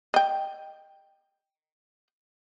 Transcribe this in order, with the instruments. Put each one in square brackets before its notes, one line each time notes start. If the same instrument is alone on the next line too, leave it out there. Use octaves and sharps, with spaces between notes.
[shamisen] D#5 G5